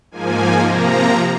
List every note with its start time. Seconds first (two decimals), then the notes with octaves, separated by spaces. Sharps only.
0.11 G#2 F3 A#3 G#5
0.66 C3 F3 A#3 A#5